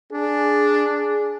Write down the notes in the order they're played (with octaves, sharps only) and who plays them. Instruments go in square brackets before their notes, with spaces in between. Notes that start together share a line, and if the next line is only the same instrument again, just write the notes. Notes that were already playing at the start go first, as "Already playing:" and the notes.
[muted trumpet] D4 [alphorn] G#4